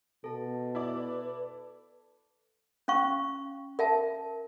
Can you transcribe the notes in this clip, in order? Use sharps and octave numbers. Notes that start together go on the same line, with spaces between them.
B2 A4 A5
E4 B4 D5
C#4 F5 C#6
A#4 E5 A5